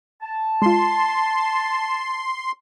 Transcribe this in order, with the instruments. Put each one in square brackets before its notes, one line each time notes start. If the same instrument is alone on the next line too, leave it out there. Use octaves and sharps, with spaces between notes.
[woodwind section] A5
[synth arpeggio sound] G#3 F4 [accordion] C6